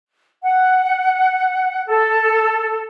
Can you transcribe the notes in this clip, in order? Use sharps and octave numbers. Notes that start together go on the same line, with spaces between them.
F#5
A4